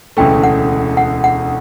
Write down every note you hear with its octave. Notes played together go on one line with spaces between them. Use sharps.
E1 D2 C#3 E3 A3 G5
F#5
F#5
F#5